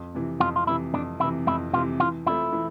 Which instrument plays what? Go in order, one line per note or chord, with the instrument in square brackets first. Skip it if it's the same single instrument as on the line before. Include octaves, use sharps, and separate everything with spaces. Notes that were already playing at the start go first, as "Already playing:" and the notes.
Already playing: [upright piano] F2
C3 E3
[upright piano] F2 [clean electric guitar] F4
[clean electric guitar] F4
[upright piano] C3 E3 [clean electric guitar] E4
[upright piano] F2 [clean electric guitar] D4
[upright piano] C3 E3 [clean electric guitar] E4
[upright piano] F2 [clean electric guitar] E4
[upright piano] C3 E3 [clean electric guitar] F4
[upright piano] E3 [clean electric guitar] F4
[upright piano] A3 C4 F4 [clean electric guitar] E4
[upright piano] E3